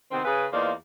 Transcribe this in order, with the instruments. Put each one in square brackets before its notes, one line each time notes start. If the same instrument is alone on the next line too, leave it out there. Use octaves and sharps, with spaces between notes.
[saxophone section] C3 D#3 B3 C4
C#3 G#4 B4
E2 A#3 D#4 F4 C5 D5